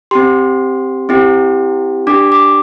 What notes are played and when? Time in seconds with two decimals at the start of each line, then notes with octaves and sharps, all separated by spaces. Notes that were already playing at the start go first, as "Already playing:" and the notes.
0.11 C4 G4 C6
1.09 C4 E4 G4
2.07 D4 G4 D6
2.32 D6